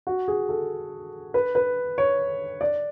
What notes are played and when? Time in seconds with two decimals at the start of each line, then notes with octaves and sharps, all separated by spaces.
0.07 F#4
0.28 G#4
0.49 A4
1.34 B4
1.55 B4
1.98 C#5
2.61 D5